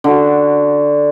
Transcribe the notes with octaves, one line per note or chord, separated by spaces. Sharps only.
D3 F#4